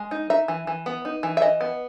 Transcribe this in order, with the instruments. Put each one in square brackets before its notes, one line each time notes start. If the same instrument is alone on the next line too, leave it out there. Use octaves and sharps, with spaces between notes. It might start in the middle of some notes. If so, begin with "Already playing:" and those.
Already playing: [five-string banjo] G#3
D#4
D#4 E5
E3
E3
B3
D#4
E3
E5
E3 D#5
B3